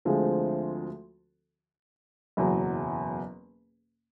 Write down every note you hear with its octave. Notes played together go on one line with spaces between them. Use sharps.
D2 D3 F3 G#3 C4
F#1 E2 B2 F#3